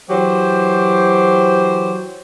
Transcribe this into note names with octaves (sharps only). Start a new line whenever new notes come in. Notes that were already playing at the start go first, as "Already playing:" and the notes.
E3 F#3 G4 C5